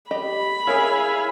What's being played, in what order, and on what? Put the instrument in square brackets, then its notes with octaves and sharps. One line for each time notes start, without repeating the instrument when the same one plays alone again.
[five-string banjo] G4 D#5 [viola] B5
[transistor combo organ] E4 F5 G#5 [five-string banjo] G#4 A#4 C#5